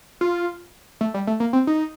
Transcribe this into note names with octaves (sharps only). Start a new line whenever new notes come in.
F4
A3
G3
A3
A#3
C4
D#4